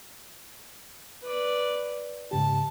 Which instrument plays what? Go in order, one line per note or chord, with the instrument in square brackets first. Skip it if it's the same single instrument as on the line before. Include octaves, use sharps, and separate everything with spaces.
[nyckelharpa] B4 D5
[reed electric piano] G#2 C#3 G4 [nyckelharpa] A5